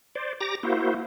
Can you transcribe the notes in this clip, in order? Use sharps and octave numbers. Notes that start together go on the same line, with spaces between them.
C5 D5
G4 A#5 D6 A#6
A#3 E4 F#4 C5